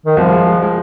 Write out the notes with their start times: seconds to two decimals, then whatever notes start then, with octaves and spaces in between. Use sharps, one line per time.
0.06 D#3
0.17 C2 F3
0.32 G#3
0.47 G#3
0.62 G#3